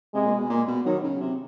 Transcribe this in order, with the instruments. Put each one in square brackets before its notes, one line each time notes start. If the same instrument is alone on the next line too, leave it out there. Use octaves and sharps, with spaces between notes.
[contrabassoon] C3 [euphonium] G#3
[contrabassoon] A#2
B2
A#2
B2
[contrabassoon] D#3 [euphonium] F#3
[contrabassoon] C#3
C3